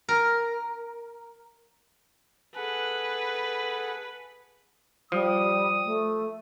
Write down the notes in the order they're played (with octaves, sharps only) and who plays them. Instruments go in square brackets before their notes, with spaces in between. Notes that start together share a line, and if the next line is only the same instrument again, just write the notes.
[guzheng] A#4
[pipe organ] G#4 A4 F#5 [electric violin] B4
[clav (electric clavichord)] F3 [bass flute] G3 [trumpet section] D#6
[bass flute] A3